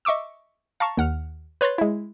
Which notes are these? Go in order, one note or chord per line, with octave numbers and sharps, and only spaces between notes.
D#5 E5 C#6 D6 E6
F5 A5 A#5 C#6
D#2 F#5 F6
B4 C#5 C6 F#6 A6
G#3 E4